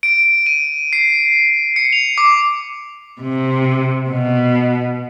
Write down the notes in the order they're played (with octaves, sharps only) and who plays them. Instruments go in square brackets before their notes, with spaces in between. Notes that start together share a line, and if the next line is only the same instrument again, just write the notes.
[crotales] D7
D#7
C7
C#7
F7
D6
[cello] C3
B2